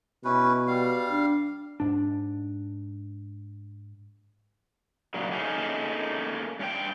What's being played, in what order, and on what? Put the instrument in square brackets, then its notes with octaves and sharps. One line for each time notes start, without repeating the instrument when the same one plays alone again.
[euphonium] B2 [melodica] C#4 E4 B4
[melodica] G3 F5
[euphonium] D4
[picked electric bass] G#2 D4
[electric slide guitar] A#2 C#3 F#3
A3 A#3 C#4 D#4 G#4 A4
G2 C#4 D4 G5